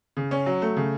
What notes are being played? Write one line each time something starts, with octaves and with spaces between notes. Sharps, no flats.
C#3
C#4
F#3
A3
C#3